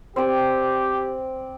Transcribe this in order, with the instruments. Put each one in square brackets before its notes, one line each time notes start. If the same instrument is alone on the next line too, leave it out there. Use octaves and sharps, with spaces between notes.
[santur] C4 D5 [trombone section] G4